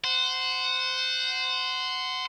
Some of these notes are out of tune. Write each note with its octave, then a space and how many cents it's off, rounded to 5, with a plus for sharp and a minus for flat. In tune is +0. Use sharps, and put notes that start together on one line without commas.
C5 -15 F#5 +0